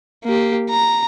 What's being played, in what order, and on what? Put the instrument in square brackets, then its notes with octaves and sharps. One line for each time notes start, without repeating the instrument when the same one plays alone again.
[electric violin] A#3 G4
A#5